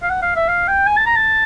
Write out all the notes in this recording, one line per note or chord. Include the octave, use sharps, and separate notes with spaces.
F5
F#5
F5
E5
F5
G5
G#5
A5
A#5
A5